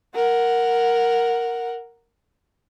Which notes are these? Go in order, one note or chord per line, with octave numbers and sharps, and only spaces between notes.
A#4 F#5